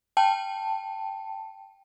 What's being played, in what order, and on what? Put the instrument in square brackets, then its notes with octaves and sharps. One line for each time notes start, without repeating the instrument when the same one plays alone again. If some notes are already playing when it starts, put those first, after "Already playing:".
[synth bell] G5 A5